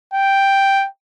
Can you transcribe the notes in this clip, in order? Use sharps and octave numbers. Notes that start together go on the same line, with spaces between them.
G5